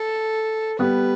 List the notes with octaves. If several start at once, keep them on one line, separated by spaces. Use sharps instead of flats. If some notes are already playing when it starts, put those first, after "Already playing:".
Already playing: A4
G3 B3 B4